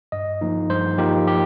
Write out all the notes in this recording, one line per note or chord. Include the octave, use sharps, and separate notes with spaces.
G2 D#5
F3 A#3 D#4
G2 C5
F3 A#3 D#4 G4
G4